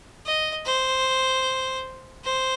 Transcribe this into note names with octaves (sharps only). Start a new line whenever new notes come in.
D#5
C5
C5